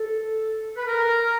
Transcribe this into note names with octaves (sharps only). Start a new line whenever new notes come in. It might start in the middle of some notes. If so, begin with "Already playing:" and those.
Already playing: A4
B4
A#4